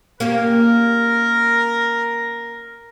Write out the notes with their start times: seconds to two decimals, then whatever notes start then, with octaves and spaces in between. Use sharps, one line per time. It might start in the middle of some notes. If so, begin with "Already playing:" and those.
0.20 A#3 C#4 G4 A#4